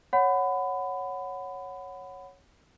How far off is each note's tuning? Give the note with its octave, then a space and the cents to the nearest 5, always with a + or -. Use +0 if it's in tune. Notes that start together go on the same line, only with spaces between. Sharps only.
C#5 -5 F#5 +0 B5 +25